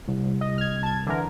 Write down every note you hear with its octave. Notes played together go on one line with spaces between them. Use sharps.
C2
D#5
F6 G#6
A5 G#6
D3 E3 A#4